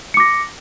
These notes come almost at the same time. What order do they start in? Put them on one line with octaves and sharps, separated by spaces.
C#7 D6 A#6